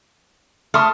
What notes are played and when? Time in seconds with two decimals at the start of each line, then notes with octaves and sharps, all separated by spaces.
0.74 A3 C6 D#6 F6